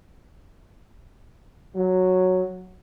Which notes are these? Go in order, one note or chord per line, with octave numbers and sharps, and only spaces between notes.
F#3